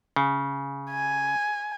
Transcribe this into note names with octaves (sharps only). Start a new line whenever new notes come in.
C#3
G#5